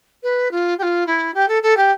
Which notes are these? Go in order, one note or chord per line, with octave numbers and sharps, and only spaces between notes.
B4
F4
G4
F4
E4
G4
A4
A4
G4